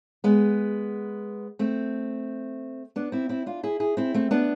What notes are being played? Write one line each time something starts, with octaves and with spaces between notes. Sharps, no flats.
G#3 B3
A3 C4
B3 D4
C4 E4
C4 E4
D4 F4
E4 G#4
E4 G#4
C4 E4
A3 C4
B3 D4